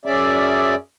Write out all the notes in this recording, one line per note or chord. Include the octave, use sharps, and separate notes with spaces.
F#2 C#4 G#4 D5 E5